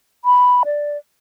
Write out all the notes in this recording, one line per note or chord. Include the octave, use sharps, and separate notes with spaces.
B5
D5